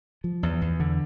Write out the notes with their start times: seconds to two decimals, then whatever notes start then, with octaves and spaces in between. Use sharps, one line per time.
0.24 F3
0.43 E2
0.61 E2
0.80 D3